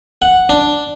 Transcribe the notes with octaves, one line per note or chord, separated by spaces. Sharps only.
F#5
D4